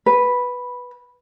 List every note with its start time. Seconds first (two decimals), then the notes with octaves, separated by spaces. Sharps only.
0.06 B4